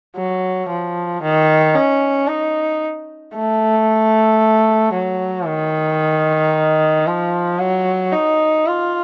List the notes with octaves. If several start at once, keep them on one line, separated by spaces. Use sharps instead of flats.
F#3
F3
D#3
C#4
D#4
A3
F#3
D#3
F3
F#3
D#4
F4